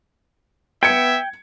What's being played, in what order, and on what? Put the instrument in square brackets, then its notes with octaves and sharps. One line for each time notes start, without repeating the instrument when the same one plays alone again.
[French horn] B3 [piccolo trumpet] E5 [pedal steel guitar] G5 [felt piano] G#6 C#7